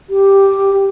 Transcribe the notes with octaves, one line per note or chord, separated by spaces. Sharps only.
G4